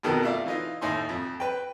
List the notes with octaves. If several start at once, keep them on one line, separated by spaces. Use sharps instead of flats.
F2 B2 D#3 A4 A#4
A3 F4 D5
E3 D#4 F4
D#2 A2 D#4 G#5 C6
F2
B4 G5